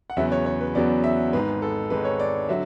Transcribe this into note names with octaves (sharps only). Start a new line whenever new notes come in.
F#5
E2 C#3 F#3 B3 E5
C#5
C#5
B4
E2 C#3 F#3 B3 D5
E5
G#1 G#2 G#3 B4
A4
G#1 G#2 G#3 B4
C#5
D5
D3 F#3 E5